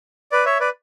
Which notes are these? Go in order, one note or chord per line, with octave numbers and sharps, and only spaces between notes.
B4 D5
C#5 E5
B4 D5